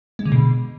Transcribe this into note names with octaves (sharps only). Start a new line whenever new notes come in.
G#3
D3
B2